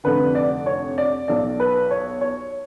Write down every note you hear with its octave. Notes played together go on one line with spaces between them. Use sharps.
F1 F2 D3 B4
D5
C#5
D5
B1 B2 D5
B4
C#5
C#5